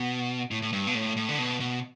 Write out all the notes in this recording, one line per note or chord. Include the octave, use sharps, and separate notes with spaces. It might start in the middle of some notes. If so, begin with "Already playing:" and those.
Already playing: B2
A2
A2
G2
B2
A2
A2
D3
B2
B2